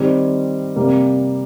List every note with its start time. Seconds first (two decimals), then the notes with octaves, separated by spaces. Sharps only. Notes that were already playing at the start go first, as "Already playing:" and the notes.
Already playing: D#3 G3 C4
0.76 C3 G3 A#3